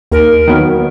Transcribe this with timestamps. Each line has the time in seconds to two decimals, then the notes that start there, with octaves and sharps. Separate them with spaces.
0.12 D#2 A#4
0.47 D#3 F#3 B3